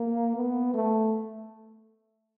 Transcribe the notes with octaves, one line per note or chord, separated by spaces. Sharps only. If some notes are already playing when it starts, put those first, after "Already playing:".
Already playing: A#3
B3
A3